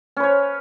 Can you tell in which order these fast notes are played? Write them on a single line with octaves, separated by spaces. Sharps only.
C#4 B4 C#5